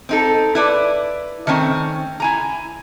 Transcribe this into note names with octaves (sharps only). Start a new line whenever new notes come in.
C4 D#4 A4
E4 B4 D5
D#3 A3 C4 C#4
E4 G#5 A#5